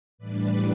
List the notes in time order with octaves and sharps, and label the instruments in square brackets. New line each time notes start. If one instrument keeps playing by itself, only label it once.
[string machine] A2 E3 G3 D4 B4 D5